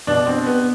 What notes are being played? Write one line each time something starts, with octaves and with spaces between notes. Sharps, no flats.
B2 D4
C4
B3